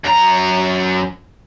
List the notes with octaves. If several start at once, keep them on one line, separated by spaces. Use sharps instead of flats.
F#2 A#5